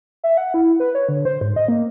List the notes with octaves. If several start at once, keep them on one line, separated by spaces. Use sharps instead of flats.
E5
F#5
E4
B4
C#5
D3
C5
G#2
D#5
A#3